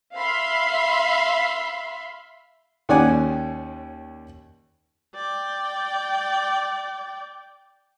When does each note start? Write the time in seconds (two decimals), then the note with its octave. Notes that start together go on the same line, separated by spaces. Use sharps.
0.15 E5 F5 B5 C6
2.89 D#2 D#3 C#4 D5 F#5 G#5
5.15 D5 G5